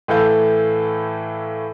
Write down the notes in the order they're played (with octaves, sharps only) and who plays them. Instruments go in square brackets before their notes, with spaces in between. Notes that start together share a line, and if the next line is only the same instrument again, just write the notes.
[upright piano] A2 E3 A3 A4 F5 G6